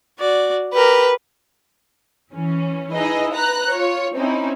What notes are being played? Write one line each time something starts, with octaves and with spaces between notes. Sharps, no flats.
F#4 D5
G4 A#4 B4
E3 C#4
D#4 E4 G#4 B4 D#5
B4 A#5 F#6
F4 C#5
C4 C#4 D#4 E4